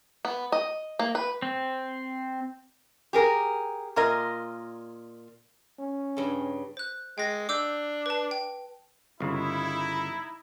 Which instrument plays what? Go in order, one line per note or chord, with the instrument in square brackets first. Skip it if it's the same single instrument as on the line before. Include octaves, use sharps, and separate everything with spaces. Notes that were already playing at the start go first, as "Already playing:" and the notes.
[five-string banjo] B3
D#5
A#3
B4
[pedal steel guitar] C4
[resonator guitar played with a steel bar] G4 G#4 A#4
A#2 F4 A#4 D#5
[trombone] C#4
[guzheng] G2 C#3
[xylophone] C5 F#6
[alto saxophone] G#3 [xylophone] G5 A#6
[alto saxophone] D4 [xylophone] D6 E6 G6
[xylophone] B4 A5
G5
[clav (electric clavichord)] G1 C#3 [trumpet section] D#4 E4